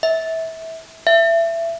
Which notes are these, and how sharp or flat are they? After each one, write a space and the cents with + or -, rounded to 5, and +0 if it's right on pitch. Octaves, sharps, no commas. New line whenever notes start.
E5 -25
E5 +20